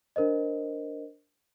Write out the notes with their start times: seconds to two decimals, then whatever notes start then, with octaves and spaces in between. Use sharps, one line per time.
0.16 D4 A#4 C5 D#5